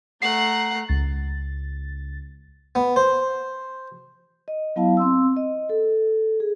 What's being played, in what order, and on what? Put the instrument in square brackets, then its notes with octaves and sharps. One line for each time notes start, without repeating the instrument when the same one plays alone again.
[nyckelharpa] A3 A#5 [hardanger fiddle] F#5 [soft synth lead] C7
[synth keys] C#2 A6
[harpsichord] B3
C5
[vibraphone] D#5
F#3 B3 E4 F5 A5
C4 C6 E6
D#5
A4
G#4